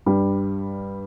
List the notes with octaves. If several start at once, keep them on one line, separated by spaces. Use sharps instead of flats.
G2 G3